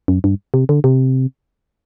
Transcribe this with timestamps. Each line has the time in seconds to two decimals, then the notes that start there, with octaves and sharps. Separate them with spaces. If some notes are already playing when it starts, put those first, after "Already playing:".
0.08 F#2
0.24 G2
0.54 C3
0.69 D3
0.84 C3